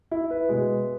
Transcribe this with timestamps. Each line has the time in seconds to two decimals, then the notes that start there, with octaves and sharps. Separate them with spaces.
0.11 E4
0.30 B4
0.49 B2 G#3